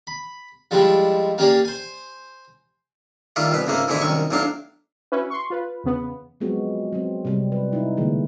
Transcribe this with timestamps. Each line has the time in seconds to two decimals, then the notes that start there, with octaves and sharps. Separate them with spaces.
0.07 B5
0.71 F3 G3 G#3 D4 E4 G4
1.38 A#3 C#4 G4 G#4 C#5 D5
1.65 C5 G#5
3.36 D#3 G3 A3 F4 G4
3.51 C2 B2 B4
3.67 C#2 G#2 C#3 A3 A#3
3.88 G#2 B2 D3 E3 A3 E4
4.02 C2 F#2 D#3 C#6
4.31 B1 A2 F#3 D4 F5
5.12 C#4 E4 F#4 B4
5.30 C6 C#6
5.50 F4 B4
5.84 E2 C#3 B3
6.40 F3 F#3 G#3 B3 C4 F#4
6.93 F#3 B3 C4
7.25 C3 G3 C4
7.52 B4
7.73 D#4 E4
7.97 B2 D3 E3 G#3 A#3